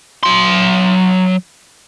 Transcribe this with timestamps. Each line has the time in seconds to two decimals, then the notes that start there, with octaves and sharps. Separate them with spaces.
0.23 F#3 C6